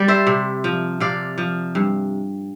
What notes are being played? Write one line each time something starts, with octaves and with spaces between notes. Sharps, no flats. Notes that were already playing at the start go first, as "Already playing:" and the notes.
Already playing: G3 D5
C5 E5
C3
F3
C3 D5 F5
F3
G2